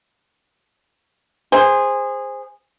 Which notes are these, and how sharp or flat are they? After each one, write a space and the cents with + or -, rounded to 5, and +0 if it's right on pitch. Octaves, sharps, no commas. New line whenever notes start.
G#4 -20 C5 +0